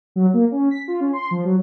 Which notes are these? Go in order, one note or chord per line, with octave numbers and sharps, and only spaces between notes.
F#3
A#3
C#4
B6
F4
C#4
C6
F3
F#3